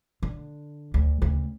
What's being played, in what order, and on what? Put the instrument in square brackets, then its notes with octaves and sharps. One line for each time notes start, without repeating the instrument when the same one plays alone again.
[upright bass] D3
D2
D2 C#3